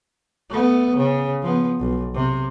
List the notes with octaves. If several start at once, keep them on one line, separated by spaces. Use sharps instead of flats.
A3 B3
C#3
F3 B3
B1
C3